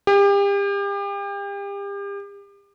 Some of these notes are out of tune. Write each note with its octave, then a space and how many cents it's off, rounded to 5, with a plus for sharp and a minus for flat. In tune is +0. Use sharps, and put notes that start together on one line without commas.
G4 +35